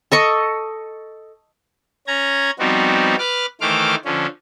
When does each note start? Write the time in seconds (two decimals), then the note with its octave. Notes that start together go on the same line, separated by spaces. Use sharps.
0.12 A4 D#5 C#6
2.07 C#4 A#5 G#6
2.59 F3 G3 B3 C4 D#4 F#4
3.19 B4 D6 F6
3.61 D#3 E3 A3 C5 D6 F6
4.05 D3 F3 C#4